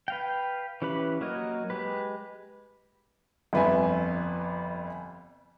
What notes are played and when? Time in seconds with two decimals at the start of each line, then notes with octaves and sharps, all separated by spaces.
0.08 B4 F5 G5
0.82 E3 C#4 G4 B4 B5
1.21 F#3 A#3 A#4 C#5 D#5
1.70 G#3 G4 B4
3.53 G1 F2 B4 E5 G#5